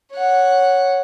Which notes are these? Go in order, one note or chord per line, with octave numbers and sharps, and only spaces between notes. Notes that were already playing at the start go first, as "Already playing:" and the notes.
C#5 F#5